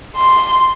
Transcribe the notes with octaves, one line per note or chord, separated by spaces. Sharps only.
C6